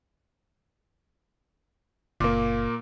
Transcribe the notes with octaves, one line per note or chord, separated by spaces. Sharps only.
F#1 A#2 A#3